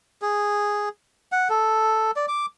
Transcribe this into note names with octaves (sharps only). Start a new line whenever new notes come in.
G#4
F#5
A4
D5
D6